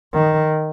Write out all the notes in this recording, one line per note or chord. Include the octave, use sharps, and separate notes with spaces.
D#3